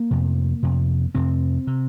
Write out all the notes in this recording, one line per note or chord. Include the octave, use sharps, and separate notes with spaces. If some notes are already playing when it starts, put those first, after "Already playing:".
Already playing: A#3
F2 C3
F2 C3
F2 C3 C4
C3